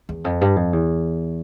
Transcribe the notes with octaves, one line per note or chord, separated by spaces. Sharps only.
E2
F2
G2
F2
E2